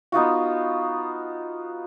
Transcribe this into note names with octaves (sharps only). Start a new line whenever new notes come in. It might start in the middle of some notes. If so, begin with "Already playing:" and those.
B3 D#4 F4 F#4